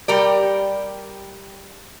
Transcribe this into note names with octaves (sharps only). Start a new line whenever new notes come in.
G3 G4 A#4 D5